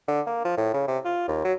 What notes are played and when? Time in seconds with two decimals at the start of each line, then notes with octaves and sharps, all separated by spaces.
0.08 D3
0.27 A#3
0.45 F3
0.57 A2
0.74 C#3
0.88 C3
1.05 F4
1.28 D#2
1.44 F#3